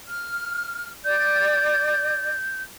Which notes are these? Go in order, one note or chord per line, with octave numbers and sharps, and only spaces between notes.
F6
D5 G6